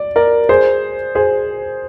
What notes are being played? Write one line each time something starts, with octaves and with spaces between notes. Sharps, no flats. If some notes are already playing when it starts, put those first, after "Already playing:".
Already playing: D5
A#4 D5
G#4 C5
G#4 C5